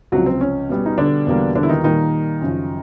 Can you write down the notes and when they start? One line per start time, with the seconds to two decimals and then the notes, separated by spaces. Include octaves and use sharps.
0.12 C#2 C3 F3 F#3 F#4
0.26 C4
0.41 C#4
0.69 B2 G3 B3
0.86 D#4
0.98 D3 D4
1.27 E2 B2 G3 A#3
1.55 D3 D4
1.63 E4
1.69 D#3 D#4
1.84 A#2 D#3 G3 A#3 D#4
2.41 F#2 C#3 F3